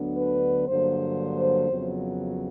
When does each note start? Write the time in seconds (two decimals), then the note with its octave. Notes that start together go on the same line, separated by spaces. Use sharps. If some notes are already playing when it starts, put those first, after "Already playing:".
Already playing: D2 D3 F#3 B3 D4
0.17 B4
0.68 G2 D3 F#3 A#3 C5
1.69 F2 C#3 F#3 B3